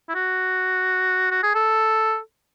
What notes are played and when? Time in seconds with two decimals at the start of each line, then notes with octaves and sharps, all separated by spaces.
0.09 E4
0.15 F#4
1.31 F#4
1.43 G#4
1.55 A4